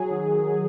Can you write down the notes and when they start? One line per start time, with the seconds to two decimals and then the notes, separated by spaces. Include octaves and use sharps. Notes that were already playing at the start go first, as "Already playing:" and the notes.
Already playing: F#3 G#4
0.10 D#3